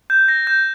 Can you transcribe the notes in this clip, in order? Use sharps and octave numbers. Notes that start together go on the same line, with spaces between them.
G6
A#6
G6